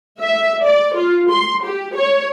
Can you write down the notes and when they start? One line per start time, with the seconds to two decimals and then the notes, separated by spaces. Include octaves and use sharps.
0.21 E5
0.64 D5
0.94 F4
1.31 C6
1.65 G4
1.96 C#5